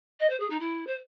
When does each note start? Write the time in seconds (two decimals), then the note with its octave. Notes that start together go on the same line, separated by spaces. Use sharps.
0.20 D#5
0.30 C5
0.40 G#4
0.50 D#4
0.60 E4
0.87 C5